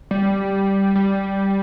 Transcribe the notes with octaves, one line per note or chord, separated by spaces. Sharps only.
G3
G3